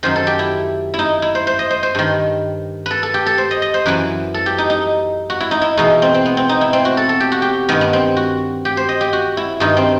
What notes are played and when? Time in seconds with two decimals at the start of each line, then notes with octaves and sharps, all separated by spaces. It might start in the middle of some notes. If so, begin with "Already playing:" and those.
0.03 F#2 D#3 C5
0.16 A4
0.27 G4
0.39 E4
0.94 E4
0.99 D#4
1.22 E4
1.35 C5
1.47 C5
1.59 D#5
1.71 C5
1.83 C5
1.95 G2 D#3
2.86 A4 B4
3.03 A4
3.14 G4
3.26 A4
3.38 C5
3.51 D#5
3.62 D#5
3.74 C5
3.86 F#2 E3 B4
4.34 A4
4.46 G4
4.58 D#4
4.70 D#4
5.30 F#4
5.40 E4
5.51 D#4
5.62 E4
5.77 E2 B2 D#4
6.02 C4
6.14 C4
6.26 B3
6.37 C4
6.49 D#4
6.61 E4
6.73 C4
6.85 F#4
6.97 A4
7.09 A4
7.20 G4
7.32 F#4
7.42 G4
7.69 G2 D#3 B3
7.81 B3
7.93 C4
8.17 F#4
8.65 G4
8.77 C5
8.89 D#5
9.01 G4
9.13 F#4
9.37 E4
9.60 G2 D#3 D#4
9.77 C4